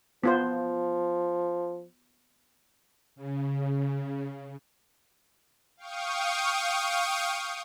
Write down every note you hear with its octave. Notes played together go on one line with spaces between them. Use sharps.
F3 B3 F4 C5
C#3
F5 G5 C#6 D#6